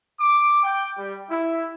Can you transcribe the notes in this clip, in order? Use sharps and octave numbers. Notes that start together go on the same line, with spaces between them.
D6
G5
G3
E4